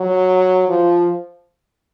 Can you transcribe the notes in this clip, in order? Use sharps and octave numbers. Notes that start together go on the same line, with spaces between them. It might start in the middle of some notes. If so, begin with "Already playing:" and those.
Already playing: F#3
F3